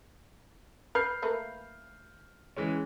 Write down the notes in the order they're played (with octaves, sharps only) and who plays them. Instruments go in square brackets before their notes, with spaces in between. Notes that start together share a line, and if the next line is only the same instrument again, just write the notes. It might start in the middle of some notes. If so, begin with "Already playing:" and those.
[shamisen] B4 [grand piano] F6 G6 C7
[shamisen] A3 A#3 B4
[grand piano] E3 G#3 C#4